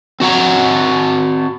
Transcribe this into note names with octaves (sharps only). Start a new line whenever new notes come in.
C4 F#4 F#5 A#5